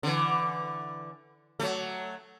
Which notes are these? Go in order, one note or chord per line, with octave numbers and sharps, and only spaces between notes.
D3 E3
F#3 A3